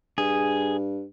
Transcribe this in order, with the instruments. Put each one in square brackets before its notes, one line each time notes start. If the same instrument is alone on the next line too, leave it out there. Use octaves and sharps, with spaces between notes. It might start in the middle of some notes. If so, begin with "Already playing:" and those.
[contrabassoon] G2 [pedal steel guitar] G#4